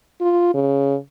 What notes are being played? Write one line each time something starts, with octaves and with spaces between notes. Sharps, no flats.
F4
C#3